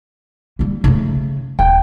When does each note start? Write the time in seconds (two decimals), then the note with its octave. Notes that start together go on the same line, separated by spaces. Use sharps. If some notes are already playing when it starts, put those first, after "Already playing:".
0.59 G3 A#3
0.84 C#3 A3
1.59 D#1 G5